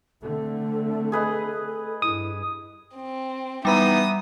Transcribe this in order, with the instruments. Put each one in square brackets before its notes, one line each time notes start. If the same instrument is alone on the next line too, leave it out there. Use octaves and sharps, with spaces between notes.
[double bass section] D3 A3 C4 [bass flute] A4
[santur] G#4 B4 D#5
[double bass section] G2 [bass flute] E4 [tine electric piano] D#6
[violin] C4
[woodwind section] E3 B3 D#4 [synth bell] G3 A#5 B5 [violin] E5 D#6